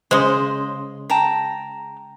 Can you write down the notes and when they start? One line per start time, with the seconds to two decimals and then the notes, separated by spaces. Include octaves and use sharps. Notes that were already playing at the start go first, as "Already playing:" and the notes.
0.11 C#3 G#3 C5 D#5
1.10 G5 A5 A#5